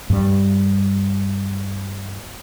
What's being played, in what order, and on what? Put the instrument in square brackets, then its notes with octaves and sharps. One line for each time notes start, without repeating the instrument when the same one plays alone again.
[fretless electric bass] G2 G3